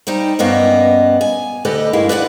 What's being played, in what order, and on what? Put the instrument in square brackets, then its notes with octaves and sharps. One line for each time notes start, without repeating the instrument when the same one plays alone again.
[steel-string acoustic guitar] G3 D#4 C5 G5
G2 A#3 B3 C#4 D#5
G#5
D2 G4 A4 B4 D#5
G2 G#3 A#3 E4
B4 D5 D#5 F#5